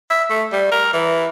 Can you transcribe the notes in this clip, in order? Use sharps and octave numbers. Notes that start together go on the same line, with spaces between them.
E5
A3
G3
A#4
E3